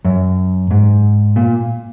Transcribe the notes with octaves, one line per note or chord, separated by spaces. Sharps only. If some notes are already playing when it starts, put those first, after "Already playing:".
F#2
G#2
A#2